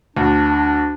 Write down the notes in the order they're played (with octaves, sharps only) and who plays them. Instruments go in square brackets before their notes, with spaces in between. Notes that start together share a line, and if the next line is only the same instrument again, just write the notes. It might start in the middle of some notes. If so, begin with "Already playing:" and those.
[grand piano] D2 [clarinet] D4